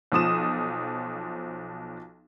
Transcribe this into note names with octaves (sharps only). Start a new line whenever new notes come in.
B1 F3 D#6 E7